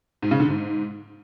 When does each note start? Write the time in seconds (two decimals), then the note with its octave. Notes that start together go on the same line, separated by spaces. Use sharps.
0.22 G#2
0.31 C#3
0.40 D3
0.48 G#2